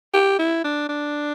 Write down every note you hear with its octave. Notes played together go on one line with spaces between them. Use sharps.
G4
E4
D4
D4